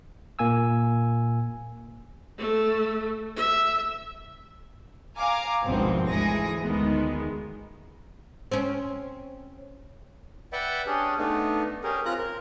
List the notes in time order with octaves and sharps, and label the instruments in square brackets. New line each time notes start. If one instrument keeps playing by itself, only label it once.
[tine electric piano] A#2 A#3 G#5 E6
[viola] A3
E5
[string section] F5 G#5 A#5 D6
G#1 D2 G2 B2 F3 C4
D2 E3 G#3 G#4 A#6
D2 D#3 G#3 B3
[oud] C4 C#4
[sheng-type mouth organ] B4 D5 E5 F#5 G5
C#4 D4 G4 G#4
A3 B3 D4 D#4
C#4 G4 G#4 A#4
C4 C#4 F4 A#5 F#6
A#4